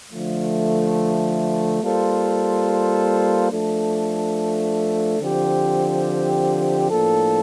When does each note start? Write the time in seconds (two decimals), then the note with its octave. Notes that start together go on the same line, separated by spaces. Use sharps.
0.12 D3 F3 A3
1.82 G3 A#3 F4 A4 C5
3.51 F3 A3 D4 A4
5.20 D3 F3 C4 G4
6.90 A2 F3 A#3 D4 A4